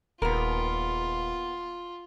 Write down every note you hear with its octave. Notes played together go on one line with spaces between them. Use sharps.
D#1 B3 F4 A#4